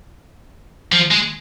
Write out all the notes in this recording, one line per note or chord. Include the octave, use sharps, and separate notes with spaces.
F3
G#3